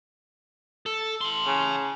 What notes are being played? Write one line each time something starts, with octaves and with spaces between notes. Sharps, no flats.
A4
A5 C6
C#3